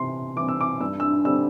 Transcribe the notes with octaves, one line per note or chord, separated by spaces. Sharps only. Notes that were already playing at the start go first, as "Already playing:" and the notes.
Already playing: C3 E3 C4 C6
E3 G3 C4 D6
E6
D6
G2 E6
E6
D3 G3 C4 E6